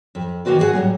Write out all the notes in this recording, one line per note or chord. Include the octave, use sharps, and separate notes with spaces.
F2
D#3 E3 A#3 F#4 B4 D5
F#4 G#4 C5 F#5 G#5
A2 F#3 G3 A#3